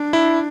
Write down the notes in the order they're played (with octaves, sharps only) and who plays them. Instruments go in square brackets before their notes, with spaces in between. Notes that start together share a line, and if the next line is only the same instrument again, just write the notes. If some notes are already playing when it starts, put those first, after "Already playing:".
Already playing: [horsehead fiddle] D4
[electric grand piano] E4